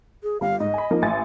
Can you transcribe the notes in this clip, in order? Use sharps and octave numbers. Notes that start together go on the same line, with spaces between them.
G#4
G1 G3 F5
G#2 D#5
G#5 B5
F3 A#3 D#4
A1 G#5 A6